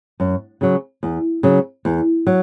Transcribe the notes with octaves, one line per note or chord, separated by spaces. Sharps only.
F#2
C#3 F#3
E2
C#3 F#3
E2
F#3